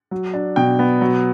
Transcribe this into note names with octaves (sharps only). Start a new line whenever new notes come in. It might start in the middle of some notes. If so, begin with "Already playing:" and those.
F#3
D4
B2 G5
B3
F#3